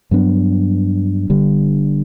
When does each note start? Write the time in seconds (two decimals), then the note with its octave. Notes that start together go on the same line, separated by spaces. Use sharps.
0.11 G2 F#3 B3 D4
1.30 G1 G2 D3 G3